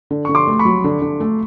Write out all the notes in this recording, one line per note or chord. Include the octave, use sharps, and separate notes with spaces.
D3
D3 C#6
C6 D6
A3
B5 C#6
F#3
D3
D3
A3